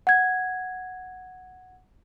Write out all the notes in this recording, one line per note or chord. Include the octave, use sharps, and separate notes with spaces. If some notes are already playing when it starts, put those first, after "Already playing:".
F#5 G#6